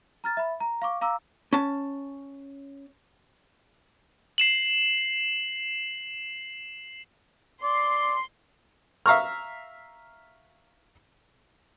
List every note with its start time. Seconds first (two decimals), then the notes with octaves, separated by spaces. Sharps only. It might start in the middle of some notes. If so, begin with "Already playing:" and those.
0.24 A#5 F6 A6
0.37 E5 B5
0.60 A#5
0.82 F5 C#6 D6
1.01 F5 A#5 D6 E6
1.53 C#4 A5
4.38 C7 E7 F#7
7.63 D5 C6
9.06 E5 F5 A#5 C#6 F6